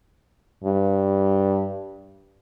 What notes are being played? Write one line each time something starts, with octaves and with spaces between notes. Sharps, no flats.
G2